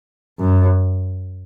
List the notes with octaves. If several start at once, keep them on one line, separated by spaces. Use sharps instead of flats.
F#2